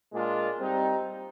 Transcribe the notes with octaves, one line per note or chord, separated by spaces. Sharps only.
A#2 G#3 D4 F4
G3 C4 D#4